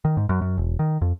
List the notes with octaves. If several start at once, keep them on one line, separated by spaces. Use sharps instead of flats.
D#3
G#2
F#2
F#2
E1
D#3
F2